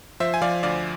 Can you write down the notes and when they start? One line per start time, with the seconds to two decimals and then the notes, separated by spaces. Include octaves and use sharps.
0.20 F3 C5 E5
0.34 G#5
0.42 F3 D5 F5
0.63 D2 D5 F5